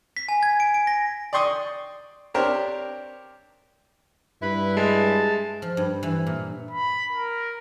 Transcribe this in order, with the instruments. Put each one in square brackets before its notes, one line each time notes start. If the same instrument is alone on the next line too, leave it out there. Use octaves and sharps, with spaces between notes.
[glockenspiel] B6
G#5
G#6
D7
D7
A#6
[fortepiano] D5 G5 C6 C#6 D#6
C4 D4 G4 A#4 C5 C#5
[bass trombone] G2 [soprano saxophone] E4 [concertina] B4 B5
[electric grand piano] G#3 [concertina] A5
[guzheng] F3
G2
E3
A#2
[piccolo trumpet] B5
A#4